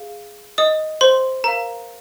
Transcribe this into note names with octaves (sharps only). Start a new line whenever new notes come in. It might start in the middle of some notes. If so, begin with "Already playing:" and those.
Already playing: G#4 F5
D#5 D#6
C5 C6
A#4 F5 A#5